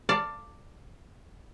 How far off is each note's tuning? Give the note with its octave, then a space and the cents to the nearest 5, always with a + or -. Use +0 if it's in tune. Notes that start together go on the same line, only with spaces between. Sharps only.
D5 +0 F5 +0 A5 +25